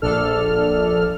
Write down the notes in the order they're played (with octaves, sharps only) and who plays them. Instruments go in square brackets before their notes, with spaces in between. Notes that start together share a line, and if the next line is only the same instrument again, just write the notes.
[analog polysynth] A#1 D4 A4 F6